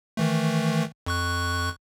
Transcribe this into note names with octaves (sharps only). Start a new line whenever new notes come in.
D#3 E3 A3
F2 C#6 F#6